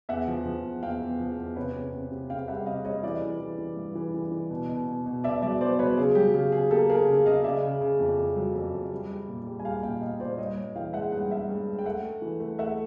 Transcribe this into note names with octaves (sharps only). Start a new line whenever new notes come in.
E2 E5 F#5
F3
F3
E2
E2 F5 G5
E2
F3
E2
C3 B4 C#5
C3
C3
C3
C3 F5 G5
G3 E5 F#5
C3 D#5 F5
G3 C#5 D#5
E3 D5 E5
E3
E3
E3
G2
E3
E3
E3
B2
B2
B2
B2
B2 D5 E5
F#3 D5 E5
B3 C5 D5
F#3 B4 C#5
C#3 G#4
F#3 G4
C#3 G4
C#3 G#4
A#3 G4 A4
A#3 G#4 A#4
C#3
C#3 D#5 F5
C#3 D5 E5
C#3
C#3
F2
F2
F#3
F2
F2
G3
G3
A#2
G3
G#5
G3 F5 G5
A#2 F5 G5
A#2 D#5 F5
A#2 C5 D5
G2 C#5 D#5
G2
E3 F5 G5
G#3 E5 F#5
G2 F#5
G5
G2 E5 F#5
G2
G#3
G5
A3 E5 F#5
A3
E3
A3
A3 E5 F#5